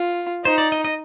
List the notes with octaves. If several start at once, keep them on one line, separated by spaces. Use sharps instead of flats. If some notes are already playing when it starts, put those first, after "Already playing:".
Already playing: F4
D#4 C5
D5
D#5
D#5